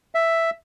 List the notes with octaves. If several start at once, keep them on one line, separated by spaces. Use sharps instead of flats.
E5